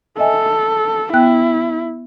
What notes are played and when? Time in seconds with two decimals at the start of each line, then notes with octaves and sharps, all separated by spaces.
0.19 A4 D#5 E5 G#5
1.14 B3 E4 G5 F#6